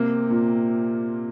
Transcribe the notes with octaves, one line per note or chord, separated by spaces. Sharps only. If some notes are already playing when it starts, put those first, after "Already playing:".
Already playing: C3 A#3 C4
A#2